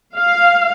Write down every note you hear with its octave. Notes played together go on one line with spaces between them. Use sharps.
F5